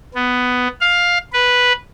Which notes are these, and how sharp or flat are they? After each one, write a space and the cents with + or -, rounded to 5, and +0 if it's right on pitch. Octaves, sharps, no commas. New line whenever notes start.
B3 +10
F5 +10
B4 -5